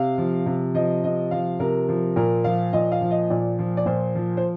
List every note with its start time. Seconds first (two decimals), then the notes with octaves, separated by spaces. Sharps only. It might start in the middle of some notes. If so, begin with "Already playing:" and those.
Already playing: C3 F5
0.18 F3
0.46 C3
0.75 F3 D#5
1.04 C3 D#5
1.31 F3 F5
1.60 C3 A#4
1.89 F3
2.16 A#2 A#4
2.44 F3 F5
2.73 A#2 D#5
2.92 F5
3.01 F3
3.11 D#5
3.30 A#2 D5
3.59 F3
3.77 D5
3.86 A#2 C5
4.15 F3
4.37 C5